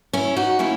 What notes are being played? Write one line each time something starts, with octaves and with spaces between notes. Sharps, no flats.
C#4 E4
D#4 F#4
D#3 A#3 C#4 E4